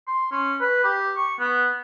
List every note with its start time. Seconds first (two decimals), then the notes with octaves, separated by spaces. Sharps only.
0.07 C6
0.32 C#4
0.61 B4
0.84 G4
1.17 C#6
1.40 B3